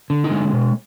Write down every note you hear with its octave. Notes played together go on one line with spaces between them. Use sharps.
D3
D#4
G#3
B2